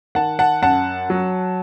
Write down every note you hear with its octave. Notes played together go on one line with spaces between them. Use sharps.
D#3 F#5 A5
F#5 A5
F#2 F#5 A5
F#3